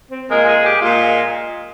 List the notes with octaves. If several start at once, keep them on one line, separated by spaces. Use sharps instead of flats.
C4
A#2 G#3 A#4
G#4
G4
A#2 G#3 F4